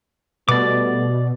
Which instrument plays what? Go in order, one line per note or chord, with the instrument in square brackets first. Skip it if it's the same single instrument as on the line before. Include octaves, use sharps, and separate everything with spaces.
[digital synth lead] B2 [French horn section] G3 A3 B3 [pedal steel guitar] D5 D6